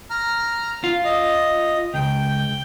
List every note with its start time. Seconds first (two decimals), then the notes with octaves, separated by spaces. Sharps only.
0.10 A#5 F6
0.84 F4
1.05 D#5
1.94 C#2 G5